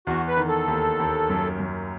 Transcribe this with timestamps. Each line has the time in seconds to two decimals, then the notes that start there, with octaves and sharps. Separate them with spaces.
0.07 E2 F#4
0.28 B4
0.37 D#3
0.48 A4
0.68 D#2
1.00 D#2
1.30 F#2
1.60 F#2